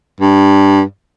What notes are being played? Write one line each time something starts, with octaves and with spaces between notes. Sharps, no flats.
G2